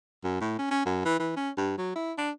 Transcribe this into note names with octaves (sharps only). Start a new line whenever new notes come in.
F#2
A2
C#4
C#4
F#2
E3
E3
C#4
G2
F#3
E4
D4